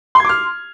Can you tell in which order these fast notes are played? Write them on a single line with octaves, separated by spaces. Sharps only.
C6 G#6 D6 F6